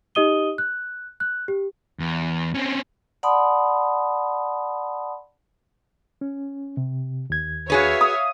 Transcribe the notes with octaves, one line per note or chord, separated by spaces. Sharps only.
D#4 G4 D#5 D#6 D#7 G7
F#6
F#6
G4
E2
C4 C#4
D5 F#5 A5 B5 C6 D#6
C#4
C3
D#2 G#6
F#4 G#4 B4 C#5 E5 F5
D#6